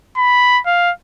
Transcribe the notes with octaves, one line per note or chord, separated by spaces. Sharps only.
B5
F5